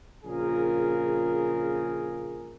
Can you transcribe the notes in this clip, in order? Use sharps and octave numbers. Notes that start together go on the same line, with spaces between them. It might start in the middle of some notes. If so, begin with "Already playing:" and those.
A#1 C#3 F4 G#4 A#4